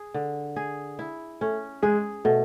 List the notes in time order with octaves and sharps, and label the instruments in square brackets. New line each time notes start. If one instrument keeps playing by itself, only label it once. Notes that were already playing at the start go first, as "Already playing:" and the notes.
Already playing: [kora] G#4
D3
G#4
E4
[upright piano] A3 [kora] C#4
[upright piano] G#3 [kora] G#4
[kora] B2 [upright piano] A3